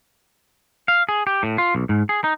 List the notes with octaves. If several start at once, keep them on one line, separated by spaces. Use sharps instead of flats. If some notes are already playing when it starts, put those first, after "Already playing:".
F5
G#4
G4
A2
F4
B1
G#2
G#4
D#4